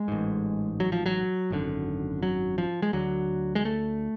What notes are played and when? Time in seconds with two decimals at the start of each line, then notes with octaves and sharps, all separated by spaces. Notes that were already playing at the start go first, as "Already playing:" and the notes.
Already playing: G#3
0.08 A1 G#2
0.80 F#3
0.92 F3
1.06 F#3
1.50 G#1 F#2 D3
2.23 F#3
2.58 F3
2.82 G#3
2.93 D2 D3 F#3
3.55 G#3
3.65 A3